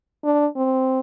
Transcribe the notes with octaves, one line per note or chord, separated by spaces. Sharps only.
D4
C4